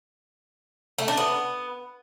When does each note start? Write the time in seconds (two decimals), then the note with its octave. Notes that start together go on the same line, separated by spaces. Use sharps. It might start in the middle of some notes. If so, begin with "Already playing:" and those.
0.98 A3
1.08 D4
1.17 B3